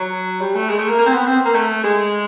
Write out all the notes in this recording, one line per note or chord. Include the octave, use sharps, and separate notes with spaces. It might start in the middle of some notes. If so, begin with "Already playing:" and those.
Already playing: F#3
G3
A3
G#3
A3
A#3
A#3
C4
B3
C4
A#3
A3
G#3